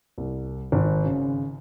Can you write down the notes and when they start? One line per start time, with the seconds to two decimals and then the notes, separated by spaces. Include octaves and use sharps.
0.18 C2
0.72 G#1
1.05 C#3